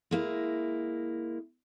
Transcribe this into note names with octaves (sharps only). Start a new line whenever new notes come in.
G#3 A#3 E4